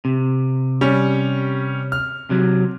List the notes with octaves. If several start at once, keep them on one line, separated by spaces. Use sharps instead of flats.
C3
G3 C#4
F6
C3 F#3